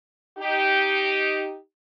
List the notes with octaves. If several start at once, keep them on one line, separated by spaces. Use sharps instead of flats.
D#4 G4